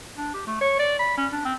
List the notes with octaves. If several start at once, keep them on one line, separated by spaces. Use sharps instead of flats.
D4
G4
A3
C#5
D5
B5
C#4
D4
C4